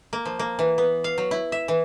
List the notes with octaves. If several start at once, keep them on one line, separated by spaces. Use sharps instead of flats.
A#3
F3
A#3
E3
B3
F5
F#3
E4
E5
E3